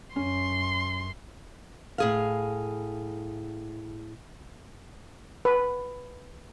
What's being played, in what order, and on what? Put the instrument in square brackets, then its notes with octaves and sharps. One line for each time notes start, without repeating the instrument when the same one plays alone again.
[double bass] F#2 [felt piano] C#4 [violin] C6
[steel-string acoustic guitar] A2 G#4 F5
[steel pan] B4